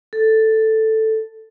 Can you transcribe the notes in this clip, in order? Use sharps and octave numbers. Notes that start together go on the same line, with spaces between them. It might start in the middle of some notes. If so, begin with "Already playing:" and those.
A4